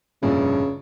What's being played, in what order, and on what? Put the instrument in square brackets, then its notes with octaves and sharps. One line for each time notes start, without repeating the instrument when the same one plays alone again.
[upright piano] F1 A#1 G2 [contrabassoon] C#3